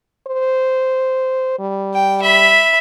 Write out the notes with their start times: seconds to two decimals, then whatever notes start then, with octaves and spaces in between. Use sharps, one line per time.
0.28 C5
1.59 G3
1.94 G5
2.22 E5 B5